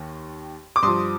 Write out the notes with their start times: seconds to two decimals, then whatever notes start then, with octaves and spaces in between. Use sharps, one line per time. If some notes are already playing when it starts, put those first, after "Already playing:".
Already playing: D#2 D#3
0.76 D6
0.82 G2 F3 C6 D#6